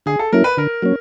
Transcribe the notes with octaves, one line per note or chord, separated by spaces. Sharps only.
D3 G#4
A4
F#3 A#3 C#4 E4 A#4
B4
D3 A#4
F#3 A#3 C#4